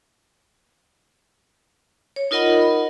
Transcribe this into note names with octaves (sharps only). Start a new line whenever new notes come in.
C#5
D#4 F4 A#4 D#5 F#5 B5
D#5